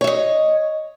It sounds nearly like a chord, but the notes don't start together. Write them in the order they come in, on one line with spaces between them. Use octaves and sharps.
C#5 E5 D#5